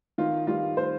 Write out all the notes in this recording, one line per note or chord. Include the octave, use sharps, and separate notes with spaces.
D#3 F4
G3 F4
C5